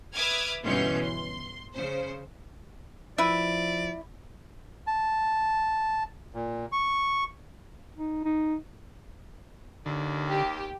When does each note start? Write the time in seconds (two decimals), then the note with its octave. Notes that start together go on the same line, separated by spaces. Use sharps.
0.14 B4 E5 D6 D#6 F6 G#6
0.64 G1 B2 E3 C#4 C6 G6
1.03 C6
1.74 C#3 C5
3.18 F3 E4 B4 D5 E5
4.87 A5
6.34 A#2
6.72 C#6
7.97 D#4
8.25 D#4
9.86 D#2 D3
10.29 G4